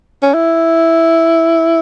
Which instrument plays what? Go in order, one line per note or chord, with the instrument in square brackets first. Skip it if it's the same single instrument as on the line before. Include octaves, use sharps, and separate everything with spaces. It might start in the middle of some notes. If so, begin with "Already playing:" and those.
[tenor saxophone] C#4
E4